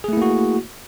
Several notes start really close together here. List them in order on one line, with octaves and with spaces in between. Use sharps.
G#4 A3 E4 A#3 F#4